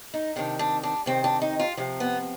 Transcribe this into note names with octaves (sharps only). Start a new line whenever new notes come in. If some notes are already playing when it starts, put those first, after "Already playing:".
D#4
C3 D#3 D4
D4
D4
C3 D#3 C4
D4
D#4
F4
C3 F3
B3